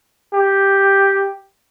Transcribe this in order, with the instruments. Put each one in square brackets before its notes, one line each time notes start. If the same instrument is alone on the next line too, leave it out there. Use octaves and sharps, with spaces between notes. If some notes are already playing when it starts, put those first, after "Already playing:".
[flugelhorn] G4